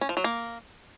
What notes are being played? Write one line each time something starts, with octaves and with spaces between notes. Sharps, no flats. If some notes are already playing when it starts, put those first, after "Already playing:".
C#4
F3
F#3
A#3